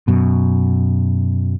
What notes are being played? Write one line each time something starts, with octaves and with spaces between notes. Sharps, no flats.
F#2 B2